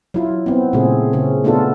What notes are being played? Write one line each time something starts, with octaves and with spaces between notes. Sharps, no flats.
F#3 E4 F4
B3 C4
A#2 C#3 A3 C4 G#4
C#3 C#4
A3 B3 D4 F4 A4